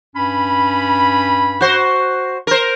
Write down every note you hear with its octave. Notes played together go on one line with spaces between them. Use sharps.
G2 C#4 B5
F#4 C5
A#4 C5